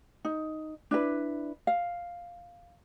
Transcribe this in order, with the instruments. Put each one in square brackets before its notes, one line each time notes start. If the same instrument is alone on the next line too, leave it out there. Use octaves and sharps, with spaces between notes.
[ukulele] D#4
D4 E4 B4
F5